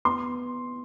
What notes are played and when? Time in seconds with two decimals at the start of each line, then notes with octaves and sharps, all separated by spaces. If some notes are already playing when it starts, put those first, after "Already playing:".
0.05 B3 C6